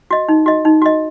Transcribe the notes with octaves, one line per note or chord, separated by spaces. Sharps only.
F#4 D#5
D#4
F#4 D#5
D#4
F#4 D#5